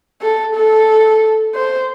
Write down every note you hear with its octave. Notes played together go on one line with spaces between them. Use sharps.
A4
A4
C5